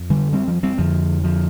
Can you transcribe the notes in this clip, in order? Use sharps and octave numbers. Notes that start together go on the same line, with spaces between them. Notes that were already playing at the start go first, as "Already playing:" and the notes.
Already playing: F2
D3 G3
G3 C4
F3
G3 C4
F2 D3 F3
F3